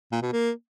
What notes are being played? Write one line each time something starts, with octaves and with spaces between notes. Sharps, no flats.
A#2
B2
A#3